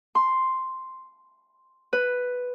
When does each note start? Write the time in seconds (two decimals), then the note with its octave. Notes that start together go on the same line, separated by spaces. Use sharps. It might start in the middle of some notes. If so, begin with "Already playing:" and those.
0.15 C6
1.93 B4